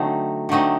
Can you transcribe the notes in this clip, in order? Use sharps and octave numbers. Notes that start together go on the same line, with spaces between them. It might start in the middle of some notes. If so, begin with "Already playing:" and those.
Already playing: D3 F#3 A3 C4 D#4
D3 F#3 A3 C4 D#4